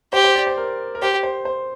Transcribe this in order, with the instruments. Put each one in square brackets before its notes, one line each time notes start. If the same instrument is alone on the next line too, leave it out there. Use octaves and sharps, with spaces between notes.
[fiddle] G4 [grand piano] C5
[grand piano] C5
D5
C5
A#4
A#4
[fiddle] G4 [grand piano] C5
[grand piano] C5
C5